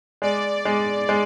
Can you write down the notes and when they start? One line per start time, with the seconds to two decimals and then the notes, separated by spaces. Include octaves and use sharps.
0.22 G#3 D5
0.65 G#3
1.09 G#3